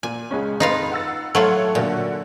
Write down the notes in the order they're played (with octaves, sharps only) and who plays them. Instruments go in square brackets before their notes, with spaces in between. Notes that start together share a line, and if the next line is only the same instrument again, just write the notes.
[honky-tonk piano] A#2 [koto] G#5
[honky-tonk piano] C#2 G#3 C#4
[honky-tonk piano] F2 B4 [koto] D#4 F4 F5
[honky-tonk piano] F#5 E6 A6
[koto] F#3 A3 F4 [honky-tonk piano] A4 C#5 F#5
[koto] A#2 [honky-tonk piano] D3 F#4 A4